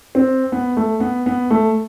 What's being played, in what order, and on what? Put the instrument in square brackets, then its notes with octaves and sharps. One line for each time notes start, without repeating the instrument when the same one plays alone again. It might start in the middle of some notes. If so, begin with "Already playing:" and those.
[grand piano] C4
B3
A3
B3
B3
A3